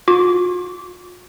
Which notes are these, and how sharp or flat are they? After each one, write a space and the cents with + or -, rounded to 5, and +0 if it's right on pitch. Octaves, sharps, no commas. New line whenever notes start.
F4 +45 D6 -25